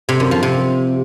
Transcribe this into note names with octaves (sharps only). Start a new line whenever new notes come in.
C3
F#2
F3
C3